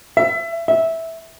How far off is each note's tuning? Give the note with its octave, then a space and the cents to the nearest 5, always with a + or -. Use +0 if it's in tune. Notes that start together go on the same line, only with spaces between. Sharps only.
E5 +25
E5 -10